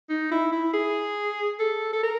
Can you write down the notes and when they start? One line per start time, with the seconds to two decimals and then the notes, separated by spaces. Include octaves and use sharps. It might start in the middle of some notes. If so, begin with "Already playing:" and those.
0.09 D#4
0.31 E4
0.52 E4
0.73 G#4
1.59 A4
1.93 A4
2.03 A#4